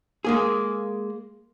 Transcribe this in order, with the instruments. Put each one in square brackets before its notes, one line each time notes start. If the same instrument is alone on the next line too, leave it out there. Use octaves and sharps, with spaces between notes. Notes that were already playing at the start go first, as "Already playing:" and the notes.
[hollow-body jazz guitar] G#3 A#3 G#4